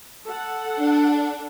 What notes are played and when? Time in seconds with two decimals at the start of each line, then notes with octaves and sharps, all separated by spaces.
0.24 A4 F#5
0.79 D4